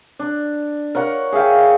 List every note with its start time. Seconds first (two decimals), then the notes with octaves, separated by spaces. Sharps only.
0.19 D4
0.95 A#4 C#5 F#5
1.32 G#4 E5 F5 G5